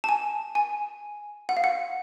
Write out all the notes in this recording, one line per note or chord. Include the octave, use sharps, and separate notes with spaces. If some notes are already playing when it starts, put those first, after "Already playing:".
A5
G#5
G#5
F#5
F5
F#5